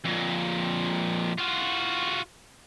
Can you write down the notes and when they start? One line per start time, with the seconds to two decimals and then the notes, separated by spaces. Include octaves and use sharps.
0.05 F2 A#2
1.38 F4 F#4